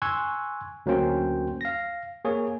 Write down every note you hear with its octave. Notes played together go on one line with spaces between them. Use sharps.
G#5 C6 C#6 E6 F#6 G#6
D2 F#3 A#3 C#4 C5 G5
F5 A#6
A#3 G#4 C#5